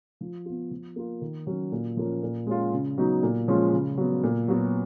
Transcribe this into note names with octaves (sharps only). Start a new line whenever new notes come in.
F3
B3 F4
F3
A#3 F4
D#3
F#3 C#4 F#4
A#2
F3 A#3 C#4
A#2
G#3 C#4 F4
C#3
F#3 B3 D#4 F#4
A#2
F3 G#3 C#4 F4
C#3
F#3 B3
A#2
F#3 B3 F#4